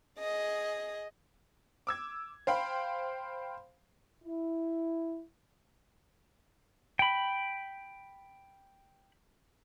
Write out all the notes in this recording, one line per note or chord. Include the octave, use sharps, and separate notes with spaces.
G#4 D#5
D6 E6 G#6
C5 F5 G5 B5
E4
G5 B5